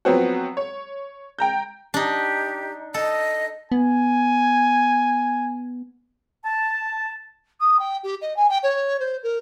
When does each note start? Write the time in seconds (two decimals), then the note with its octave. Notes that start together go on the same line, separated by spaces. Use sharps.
0.05 F3 F#3 B3 C4 F#4
0.57 C#5
1.39 G5 A#5 G6
1.94 D4 D#4 G4
2.94 A4 D#5
3.72 B3 G#5
6.44 A5
7.60 D#6
7.79 G5
8.03 G4
8.22 D#5
8.37 G#5
8.49 G5
8.63 C#5
9.00 C5
9.23 A#4